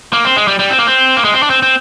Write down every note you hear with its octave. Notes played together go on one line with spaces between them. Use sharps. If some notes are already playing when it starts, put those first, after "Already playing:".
A#3
C4
G#3
G3
G3
C4
A#3
C4
A#3
G#3
C4
D4
C4
C4